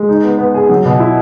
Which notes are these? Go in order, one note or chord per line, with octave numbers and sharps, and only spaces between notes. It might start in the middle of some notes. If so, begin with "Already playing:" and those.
Already playing: G#3
D#4
B3
B3
G#4
F#3
B2
E4